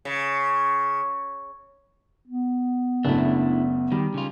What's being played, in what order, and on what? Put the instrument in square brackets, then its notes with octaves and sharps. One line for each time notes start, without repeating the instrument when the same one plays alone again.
[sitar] C#3
[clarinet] B3
[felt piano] F#1 C#3 A3 [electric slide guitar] D4 E4
[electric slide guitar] D#3 [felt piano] G3
[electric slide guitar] C#3 F4